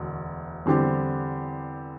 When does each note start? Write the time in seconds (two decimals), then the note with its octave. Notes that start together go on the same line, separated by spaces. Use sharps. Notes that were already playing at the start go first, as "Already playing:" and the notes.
Already playing: E1 D2
0.66 E2 D3 G3 C4 G4